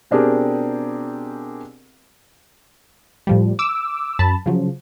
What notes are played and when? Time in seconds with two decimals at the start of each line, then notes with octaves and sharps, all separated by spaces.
0.11 B2 C4 D4 G4 G#4 A#4
3.27 A2 F3 G3
3.59 D6 E6
4.19 F#2 A5 B5
4.46 C#3 F3 F#3